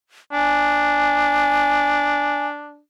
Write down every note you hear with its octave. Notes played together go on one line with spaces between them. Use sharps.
D4 G#5